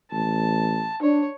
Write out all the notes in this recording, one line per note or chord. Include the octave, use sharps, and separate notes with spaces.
A1 A5
D4 C#5